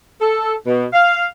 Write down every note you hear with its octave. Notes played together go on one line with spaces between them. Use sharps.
A4
B2
F5